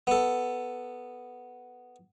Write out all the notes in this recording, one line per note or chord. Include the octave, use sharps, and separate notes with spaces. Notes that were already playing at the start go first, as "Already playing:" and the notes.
B3 A4